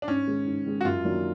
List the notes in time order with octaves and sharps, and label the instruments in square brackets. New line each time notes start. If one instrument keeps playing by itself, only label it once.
[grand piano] D4
[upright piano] G#2 [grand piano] C#4
[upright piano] D#3 G#3
G#2
D#3 G#3
[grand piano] F#4
[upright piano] F#2 [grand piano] F4
[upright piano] D#3 F#3 A#3 D4